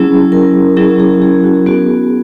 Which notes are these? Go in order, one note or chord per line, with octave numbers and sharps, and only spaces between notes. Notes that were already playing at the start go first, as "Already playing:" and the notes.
Already playing: F#3 C#4 E4 G#4
A#4
F#3 C#4 E4 G#4
G#4
G#4
F#4
B3 F#4 G#4